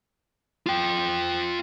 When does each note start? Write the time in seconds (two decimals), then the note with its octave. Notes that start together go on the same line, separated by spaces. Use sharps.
0.67 F4 G5